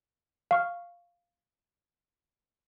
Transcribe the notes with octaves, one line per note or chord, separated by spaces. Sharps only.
F5 C#6 F6